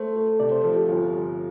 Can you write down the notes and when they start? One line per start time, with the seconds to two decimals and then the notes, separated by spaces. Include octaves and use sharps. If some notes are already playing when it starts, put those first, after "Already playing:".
Already playing: A3 C5
0.16 A3
0.40 C3 D5
0.52 C5
0.64 F3 A4
0.76 G4
0.88 G1 F4
1.13 G1